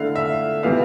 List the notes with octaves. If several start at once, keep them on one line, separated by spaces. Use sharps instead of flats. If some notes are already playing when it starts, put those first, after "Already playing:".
Already playing: D3 A3 E4 F5
E5
C3 E3 B3 F5